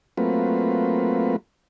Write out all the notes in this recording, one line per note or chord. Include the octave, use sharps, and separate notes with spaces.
F#3 A3 A#3 C4 F4 B4